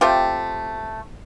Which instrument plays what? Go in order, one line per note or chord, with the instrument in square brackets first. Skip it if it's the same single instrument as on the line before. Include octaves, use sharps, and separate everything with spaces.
[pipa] A3 C4 F4 G4